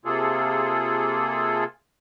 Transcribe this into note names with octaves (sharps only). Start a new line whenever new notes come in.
C3 A#3 F4 G#4 A4